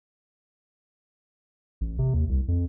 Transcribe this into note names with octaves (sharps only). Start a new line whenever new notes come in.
A1
C3
D#2
C2
F2